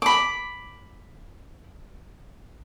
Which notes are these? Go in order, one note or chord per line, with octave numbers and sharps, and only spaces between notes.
B5 D6